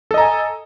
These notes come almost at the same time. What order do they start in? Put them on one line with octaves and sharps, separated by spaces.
A4 D#5 A#5 G#5